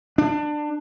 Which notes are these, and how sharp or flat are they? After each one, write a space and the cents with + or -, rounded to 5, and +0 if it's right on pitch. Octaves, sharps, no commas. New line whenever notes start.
D4 +20